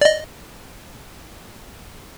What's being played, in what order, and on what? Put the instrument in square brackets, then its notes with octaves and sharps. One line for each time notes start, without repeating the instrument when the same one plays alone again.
[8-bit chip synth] D5 D#5